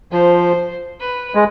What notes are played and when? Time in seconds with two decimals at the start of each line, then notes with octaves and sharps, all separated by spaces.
0.12 F3 C5
1.00 B4
1.35 G#3